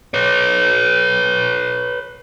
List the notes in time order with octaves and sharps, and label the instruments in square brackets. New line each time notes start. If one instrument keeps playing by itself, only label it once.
[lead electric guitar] B4 C#5